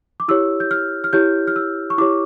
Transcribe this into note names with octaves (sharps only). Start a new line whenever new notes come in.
D6
E4 G4 C#5 E6
G6
F6
F6
E4 G4 C#5 G6
F6
E6
C#6
E4 G4 C#5 D6